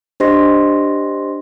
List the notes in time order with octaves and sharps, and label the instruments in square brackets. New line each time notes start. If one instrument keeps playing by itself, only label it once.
[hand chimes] D4 G4 C5 D#5 C6 A#6